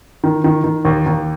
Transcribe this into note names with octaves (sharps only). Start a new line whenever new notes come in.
D#3
D#3
D#3
D#2
D#2